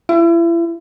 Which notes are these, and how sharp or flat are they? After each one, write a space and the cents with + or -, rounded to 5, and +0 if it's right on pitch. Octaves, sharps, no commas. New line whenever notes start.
E4 +35